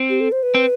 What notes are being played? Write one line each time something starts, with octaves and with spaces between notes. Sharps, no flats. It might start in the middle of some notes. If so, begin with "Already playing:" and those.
Already playing: C4
G4
A4
C5
B4
C4